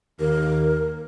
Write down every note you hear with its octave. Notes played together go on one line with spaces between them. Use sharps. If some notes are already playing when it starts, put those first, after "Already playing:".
D#2 A#4